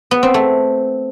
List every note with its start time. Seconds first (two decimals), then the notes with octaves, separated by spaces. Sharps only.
0.11 B3
0.23 C4
0.34 A3